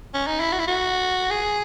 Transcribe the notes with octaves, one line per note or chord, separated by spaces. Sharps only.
C#4
D#4
E4
F#4
E4
F#4
G#4